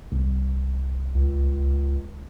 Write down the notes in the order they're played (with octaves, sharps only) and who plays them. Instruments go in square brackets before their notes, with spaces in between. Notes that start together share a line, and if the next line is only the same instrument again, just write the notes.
[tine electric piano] C2
[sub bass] C#2